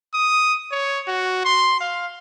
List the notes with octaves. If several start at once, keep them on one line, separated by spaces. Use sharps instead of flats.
D#6
C#5
F#4
C6
F5